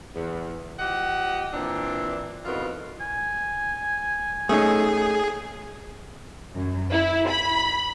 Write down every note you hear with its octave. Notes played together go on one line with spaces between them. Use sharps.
E2
F3 G4 D#5 F#5
A#2 E3 C4 D4
F2 B2 D#3 E3 F4
G#5
A3 C#4 D#4 G#4
F#2
E4
B5